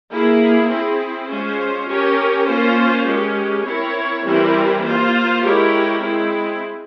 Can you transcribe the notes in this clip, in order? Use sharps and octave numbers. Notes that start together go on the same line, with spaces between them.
A#3 E4 G#4
C4 E4 G#4
G#3 C#4 F4 C5
C#4 G4 A#4 C#5
A#3 C#4 F4 C5
G#3 C#4 G4 A#4
C4 E4 A#4 C#5
E3 G3 C4 E4 A#4
A#3 F4 C5
G#3 E4 G4 A#4 C#5
G#3 C4 E4